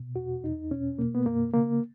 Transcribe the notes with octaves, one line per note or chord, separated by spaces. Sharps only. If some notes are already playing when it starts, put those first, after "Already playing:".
Already playing: B2
E2 F#4
E2 D#4
B2 C#4
B2 A#3
B3
F#2 A#3
C#3 A#3